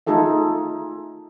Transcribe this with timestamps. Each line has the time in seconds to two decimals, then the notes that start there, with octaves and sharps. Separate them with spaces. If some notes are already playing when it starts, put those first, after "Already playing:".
0.07 A3 D#4 F4 G#4 A4 E5